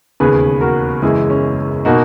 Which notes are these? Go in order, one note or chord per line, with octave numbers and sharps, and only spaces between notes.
E1 D#2 C#3 G#4 B4
F#4 A#4
F#1 F#2 E3 G#3 E4 G#4
C#4
B2 A#3 D#4 F#4